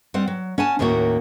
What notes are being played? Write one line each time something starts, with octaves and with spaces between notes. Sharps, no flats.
G3 C4 F#5
F#3
C#4 F#5 G#5 A5
D#2 A2 A#3 C#4 F#4